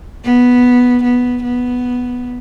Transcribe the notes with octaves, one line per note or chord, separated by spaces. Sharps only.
B3
B3
B3